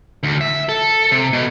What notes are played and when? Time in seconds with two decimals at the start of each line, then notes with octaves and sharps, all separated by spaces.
0.23 D2
0.41 E5
0.69 A4
1.11 C3
1.33 B2